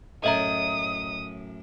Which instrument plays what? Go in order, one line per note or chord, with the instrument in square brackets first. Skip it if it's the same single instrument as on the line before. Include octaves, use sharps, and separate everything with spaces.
[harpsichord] F#2 A2 [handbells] D#5 E5 A#5 [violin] D#6